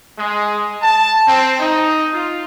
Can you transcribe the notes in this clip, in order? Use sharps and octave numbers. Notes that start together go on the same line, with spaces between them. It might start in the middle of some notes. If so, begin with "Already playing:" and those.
G#3
A5
C4
D#4
F4